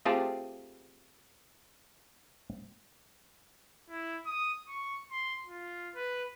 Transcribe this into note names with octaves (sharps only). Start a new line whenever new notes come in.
A3 C4 F4 G4 G#4 A5
E4
D#6
C#6
C6
F4
B4